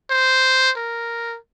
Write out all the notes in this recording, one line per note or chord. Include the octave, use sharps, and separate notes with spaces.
C5
A#4